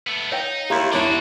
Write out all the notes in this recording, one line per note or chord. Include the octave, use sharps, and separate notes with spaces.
A3 B3
D#4 C#5 F5 G5
D#2 E4 G4 F5 A#5 C6
E2 D#3 D4 E4 F#4 C#5